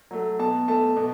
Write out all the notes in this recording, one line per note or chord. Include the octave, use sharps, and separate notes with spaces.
F#3 A3
B2 A5
A3 A5
B2